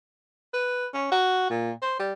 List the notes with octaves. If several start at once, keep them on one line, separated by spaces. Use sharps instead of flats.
B4
C#4
F#4
A#2
C5
G3